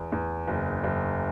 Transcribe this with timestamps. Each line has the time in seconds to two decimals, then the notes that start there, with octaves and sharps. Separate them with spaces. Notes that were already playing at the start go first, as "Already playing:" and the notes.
Already playing: E2
0.12 E2
0.48 F#1
0.84 F#1